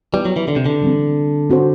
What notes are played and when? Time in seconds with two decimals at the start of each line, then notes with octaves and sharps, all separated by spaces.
0.13 G3 B3 E4 B4
0.25 F#3
0.36 E3
0.48 D3
0.56 C3
0.66 D3
0.82 E3 G3 C4
1.50 C4 F#4 C5